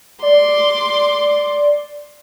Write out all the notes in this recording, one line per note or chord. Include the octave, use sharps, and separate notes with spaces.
D5 C6 D6